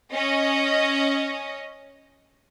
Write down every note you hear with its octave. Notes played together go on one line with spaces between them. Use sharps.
C#4 D#5